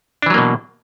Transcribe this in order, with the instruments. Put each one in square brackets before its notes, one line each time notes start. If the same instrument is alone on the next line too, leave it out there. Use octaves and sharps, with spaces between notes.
[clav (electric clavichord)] D4
E3
F#3
A#3
B2